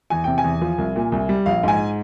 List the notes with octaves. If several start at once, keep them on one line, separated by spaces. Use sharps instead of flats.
E2 G#5
C3 G5
G#5
E2
F3
C2
A#2
C2
G3
A#1 F5
G#2 G#5